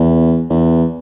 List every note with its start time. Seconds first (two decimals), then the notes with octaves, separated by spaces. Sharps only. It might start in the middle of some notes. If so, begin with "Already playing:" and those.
Already playing: E2
0.50 E2